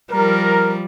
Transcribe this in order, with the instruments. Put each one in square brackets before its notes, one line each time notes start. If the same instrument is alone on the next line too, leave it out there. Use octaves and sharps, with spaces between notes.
[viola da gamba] F3 G3 [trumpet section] A#4